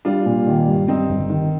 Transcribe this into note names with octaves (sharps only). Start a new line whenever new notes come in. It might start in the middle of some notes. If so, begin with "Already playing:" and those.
G3 D4 F4
A#2
D#3
G2
G2 C4 D#4
G1
D#3